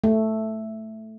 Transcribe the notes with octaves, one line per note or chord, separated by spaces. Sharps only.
A3